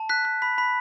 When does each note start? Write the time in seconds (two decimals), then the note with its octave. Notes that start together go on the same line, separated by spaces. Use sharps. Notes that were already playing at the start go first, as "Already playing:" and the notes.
Already playing: A5
0.09 F#6 B6
0.25 F#6
0.42 B5 B6
0.58 B5 B6